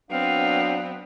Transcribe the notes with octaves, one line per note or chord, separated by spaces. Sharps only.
F#3 B3 C4 D4 F5